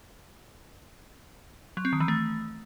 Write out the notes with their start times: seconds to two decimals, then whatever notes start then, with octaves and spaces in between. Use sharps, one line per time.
1.77 F#3
1.85 C4
1.93 D#3
2.00 E3
2.08 A3